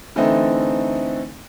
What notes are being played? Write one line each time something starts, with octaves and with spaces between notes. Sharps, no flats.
D3 E3 A3 C4 D#4